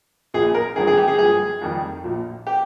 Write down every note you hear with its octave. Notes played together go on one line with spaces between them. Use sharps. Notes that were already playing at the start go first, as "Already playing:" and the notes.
A#1 A#2 F3 G#4
A#4
G#1 G2 D3 F3 G#4
G#4
G4
G#4
G2 F3 G#4
F2 D#3 G3
A#1 A#2 F3
G4